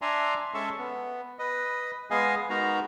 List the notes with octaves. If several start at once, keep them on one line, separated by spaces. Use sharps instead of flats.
D4 D5 E5 G#5 A#5 C6
G#3 C#4 A4 E5 A5 C#6
B3
B4 D#5
G#3 B3 G#4 D#5 F5 G#5
G#3 B3 D#4 F#4 A#4 A#5